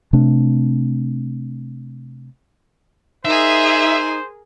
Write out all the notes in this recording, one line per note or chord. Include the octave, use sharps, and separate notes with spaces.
C3 A3 C4 D4
D#4 G#4 A#4 C5 E5